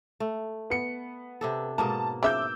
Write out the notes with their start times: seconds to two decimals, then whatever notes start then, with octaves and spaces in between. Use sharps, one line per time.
0.20 A3
0.70 B3 C#7
1.41 C3 D4 A4
1.78 G#2 B2 A#3 A5
2.23 C#3 F3 E5 D6 E6 G6